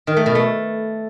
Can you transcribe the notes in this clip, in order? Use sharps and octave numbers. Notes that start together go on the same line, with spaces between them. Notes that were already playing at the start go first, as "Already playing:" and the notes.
D#3
A3
B2
A3